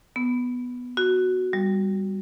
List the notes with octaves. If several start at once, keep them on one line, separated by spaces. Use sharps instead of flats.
B3
F#4
G3